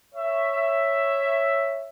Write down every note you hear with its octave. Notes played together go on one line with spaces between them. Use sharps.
C#5 E5